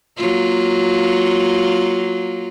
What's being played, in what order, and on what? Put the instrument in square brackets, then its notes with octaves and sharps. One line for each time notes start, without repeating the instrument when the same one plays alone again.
[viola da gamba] F#3 A#3 F4